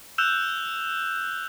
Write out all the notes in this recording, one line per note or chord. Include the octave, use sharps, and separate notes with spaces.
E6 F#6 G6 E7 F7